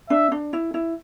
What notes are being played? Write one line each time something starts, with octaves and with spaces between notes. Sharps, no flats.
D4 E5
D4
E4
E4